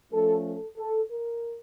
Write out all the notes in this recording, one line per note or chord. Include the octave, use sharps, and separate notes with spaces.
F3 A3 C#4 A4
A4
A4
A#4